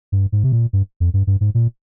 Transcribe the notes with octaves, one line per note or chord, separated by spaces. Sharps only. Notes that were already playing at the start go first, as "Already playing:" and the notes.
G2
G#2
C3
A#2
G2
F2
G2
G2
G#2
A#2